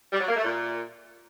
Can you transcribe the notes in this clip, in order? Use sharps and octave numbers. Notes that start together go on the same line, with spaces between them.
G3
F#3
A#3
A3
A#2